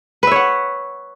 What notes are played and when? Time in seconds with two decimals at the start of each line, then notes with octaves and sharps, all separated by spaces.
0.23 B4
0.27 E5
0.31 C#5
0.36 F#5